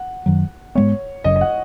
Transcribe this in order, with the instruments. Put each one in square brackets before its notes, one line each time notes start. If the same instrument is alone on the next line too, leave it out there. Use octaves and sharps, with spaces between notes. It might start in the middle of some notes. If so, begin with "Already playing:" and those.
Already playing: [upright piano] F#5
[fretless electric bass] F#2 D#3 F#3
[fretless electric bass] G#2 G#3 B3 [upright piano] C#5
[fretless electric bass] F#1 F#2 C#3 [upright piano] D#5
[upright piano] D#5
F#5